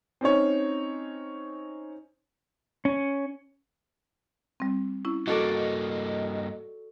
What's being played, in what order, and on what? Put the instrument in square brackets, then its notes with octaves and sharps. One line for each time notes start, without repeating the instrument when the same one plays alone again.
[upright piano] C4 C#4 D#4 C#5
[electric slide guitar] C#4
[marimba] G3 C4
C#4 E4
[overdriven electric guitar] G2 A#3 [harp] F#4 A4 D5 [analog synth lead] D#5